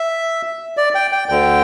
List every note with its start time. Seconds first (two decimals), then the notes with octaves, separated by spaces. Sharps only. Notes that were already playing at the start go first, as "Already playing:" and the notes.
Already playing: E5
0.77 D5
0.95 G5
1.12 G5
1.29 D2 D3 G5